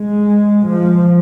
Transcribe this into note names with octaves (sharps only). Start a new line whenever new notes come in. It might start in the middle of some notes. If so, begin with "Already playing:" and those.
Already playing: G#3
F3